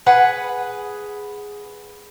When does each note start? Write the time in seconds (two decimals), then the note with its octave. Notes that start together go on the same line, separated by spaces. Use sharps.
0.06 G#4 B4 F#5